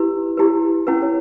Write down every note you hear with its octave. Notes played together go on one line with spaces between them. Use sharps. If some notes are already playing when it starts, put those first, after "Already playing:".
Already playing: E4 G4 B4
E4 G4 B4
C#4 E4 B4 F#5
C#5